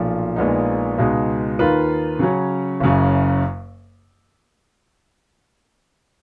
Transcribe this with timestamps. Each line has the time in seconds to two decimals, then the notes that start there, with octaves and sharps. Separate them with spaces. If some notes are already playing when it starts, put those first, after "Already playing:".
Already playing: B1 A#2 F3
0.36 A#1 A#2 G#3 B3 D#4
0.98 C#2 B2 G#3 D#4
1.59 D#2 D#3 A#3 F4 B4
2.19 C#3 F#3 C#4
2.80 F#1 F#2 C#3